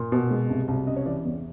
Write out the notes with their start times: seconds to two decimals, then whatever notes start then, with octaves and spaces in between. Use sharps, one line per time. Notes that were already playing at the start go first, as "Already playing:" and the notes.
Already playing: A#2
0.12 B2
0.30 G#3
0.50 C2
0.68 C2
0.87 C#3 D#5
0.96 C#5
1.06 E3 D5
1.25 E2